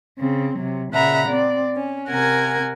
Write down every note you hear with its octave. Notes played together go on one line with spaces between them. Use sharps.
C#3 C4
C3 F#3
A#2 C#3 E5 F#5 A#5 B5
C4 D5
C#4
C3 A#4 F#5 G#5 G#6